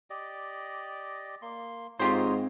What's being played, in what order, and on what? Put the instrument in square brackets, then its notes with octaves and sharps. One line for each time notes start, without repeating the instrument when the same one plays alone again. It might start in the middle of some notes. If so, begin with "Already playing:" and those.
[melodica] G4 D5 D#5
A#3 C6
[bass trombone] G#2 [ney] C4 [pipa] F4 G4 C5 [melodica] C#5 A#5 D#6